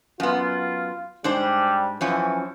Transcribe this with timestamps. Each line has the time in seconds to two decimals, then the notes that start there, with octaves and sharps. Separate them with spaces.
0.20 F#2 B3 F4
1.24 G#2 G3 D4 C5
2.01 F#2 E3 F3 C#4